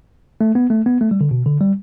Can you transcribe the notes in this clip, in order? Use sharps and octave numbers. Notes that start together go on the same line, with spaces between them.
A3
B3
A3
B3
A3
G3
D3
B2
D3
G3